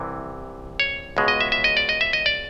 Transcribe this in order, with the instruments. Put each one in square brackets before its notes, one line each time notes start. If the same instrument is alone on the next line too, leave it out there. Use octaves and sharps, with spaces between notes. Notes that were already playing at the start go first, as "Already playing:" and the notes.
Already playing: [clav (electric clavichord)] C2 C3 E3
C#5
C#2 B2 G#3
D#5
E5
E5
D#5
D5
D#5
E5
D#5
D5